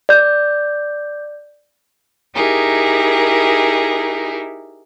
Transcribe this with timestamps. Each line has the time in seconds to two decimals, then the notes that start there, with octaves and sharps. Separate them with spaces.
0.09 D5 G6
2.35 D#4 E4 G4 G#4 A#4